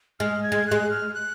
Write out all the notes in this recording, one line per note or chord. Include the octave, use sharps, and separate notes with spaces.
G#3 F6
G#6
G#3
G#3 F#6
F6
F#6